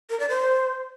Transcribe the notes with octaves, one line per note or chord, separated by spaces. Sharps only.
A#4
D5
C5